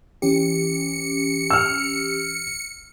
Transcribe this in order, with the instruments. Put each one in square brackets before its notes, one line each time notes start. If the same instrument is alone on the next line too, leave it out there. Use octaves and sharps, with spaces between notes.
[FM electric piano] E3 C#4 G4 [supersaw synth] C#7
[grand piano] E6 F6